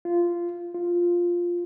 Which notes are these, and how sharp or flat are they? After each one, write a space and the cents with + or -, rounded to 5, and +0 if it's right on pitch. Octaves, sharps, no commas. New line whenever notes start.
F4 -15
F4 +0